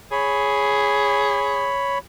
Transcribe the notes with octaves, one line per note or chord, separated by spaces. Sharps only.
G#4 C#5 B5